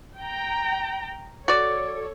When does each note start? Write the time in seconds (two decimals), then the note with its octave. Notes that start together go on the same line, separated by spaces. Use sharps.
0.18 G5 A#5
1.48 F#4 A4 C#5 D5